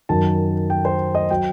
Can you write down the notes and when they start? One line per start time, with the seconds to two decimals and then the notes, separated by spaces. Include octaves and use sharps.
0.09 F#2 D#3 F#3 A5
0.70 G5
0.85 C5
1.15 D#5
1.30 F#3 G5